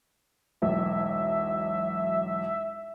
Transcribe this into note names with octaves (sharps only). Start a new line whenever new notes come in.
E1 B1 E5